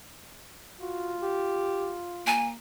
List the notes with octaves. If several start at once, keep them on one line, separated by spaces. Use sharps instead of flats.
F4 F#4
G4
A#3 G#5